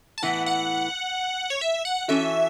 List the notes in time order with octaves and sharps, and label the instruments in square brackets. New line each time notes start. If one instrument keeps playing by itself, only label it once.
[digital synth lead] A5
[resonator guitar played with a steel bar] A2 E3 B3 E4 [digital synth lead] F#5
[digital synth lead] F#5
C#5
E5
F#5
[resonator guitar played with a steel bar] E3 C#4 F#4 A4 [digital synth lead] E5